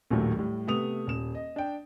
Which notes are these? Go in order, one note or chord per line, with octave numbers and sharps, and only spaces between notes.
A#1 D#2 A2 F#3 A3
A2 G3
C3 A3 B3 D#6 F7
D#1 E7
D#5
D4 G5